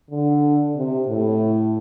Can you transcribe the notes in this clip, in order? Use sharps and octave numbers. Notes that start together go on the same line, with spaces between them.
D3
C3
A2